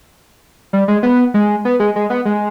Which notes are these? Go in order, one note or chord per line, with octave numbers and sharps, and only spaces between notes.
G3
G#3
B3
G#3
B3
G#3
G#3
B3
G#3